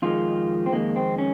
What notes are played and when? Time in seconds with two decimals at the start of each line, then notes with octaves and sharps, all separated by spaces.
0.02 F2 D#3 G#3 F4
0.66 C4
0.72 F2 D#3 G#3 A#3
0.96 C4
1.18 C#4